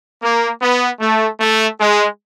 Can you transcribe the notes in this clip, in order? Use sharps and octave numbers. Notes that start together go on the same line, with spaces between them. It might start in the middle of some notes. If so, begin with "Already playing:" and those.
A#3
B3
A3
A3
G#3